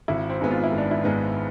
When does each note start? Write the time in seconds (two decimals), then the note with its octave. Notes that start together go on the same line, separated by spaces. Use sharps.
0.08 G#1 E4
0.30 C4
0.41 G#2 G#3 B3
0.51 F4
0.64 E4
0.72 G#1
0.78 D4
0.91 E4
1.04 G#2 G#3 B3